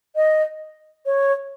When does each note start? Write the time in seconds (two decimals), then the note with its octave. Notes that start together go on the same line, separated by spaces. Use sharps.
0.16 D#5
1.06 C#5